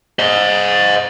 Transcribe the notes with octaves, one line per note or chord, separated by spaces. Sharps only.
C5 D#5